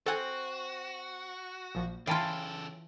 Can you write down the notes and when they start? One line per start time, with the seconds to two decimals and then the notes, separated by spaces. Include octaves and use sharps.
0.06 C4 F#4 A4 F#5 G#5
1.75 A#1 F3
2.07 C#3 E3 F4 A4 C#5 G5 A5 C7